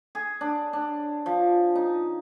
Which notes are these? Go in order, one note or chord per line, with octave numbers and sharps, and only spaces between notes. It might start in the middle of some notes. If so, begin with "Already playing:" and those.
G#4
D4
D4
F3
D#4